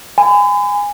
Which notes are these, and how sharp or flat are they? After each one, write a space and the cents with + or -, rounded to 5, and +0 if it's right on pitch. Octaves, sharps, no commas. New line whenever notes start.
G#5 -15 B5 +40